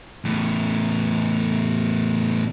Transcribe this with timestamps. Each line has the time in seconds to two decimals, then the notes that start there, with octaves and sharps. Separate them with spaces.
0.25 E2 A2